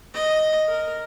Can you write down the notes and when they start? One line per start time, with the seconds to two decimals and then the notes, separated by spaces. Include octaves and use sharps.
0.14 D#5
0.68 A#4